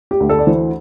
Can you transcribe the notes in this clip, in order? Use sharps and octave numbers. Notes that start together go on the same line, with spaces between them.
G4
D2
A4
D5
E3 C5